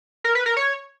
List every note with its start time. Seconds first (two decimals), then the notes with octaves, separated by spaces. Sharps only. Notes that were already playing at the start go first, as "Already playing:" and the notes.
0.24 A#4
0.35 B4
0.46 A#4
0.57 C#5